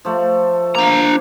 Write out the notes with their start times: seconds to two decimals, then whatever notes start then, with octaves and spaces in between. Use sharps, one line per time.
0.05 F3 A3
0.75 A#3 D4 A#5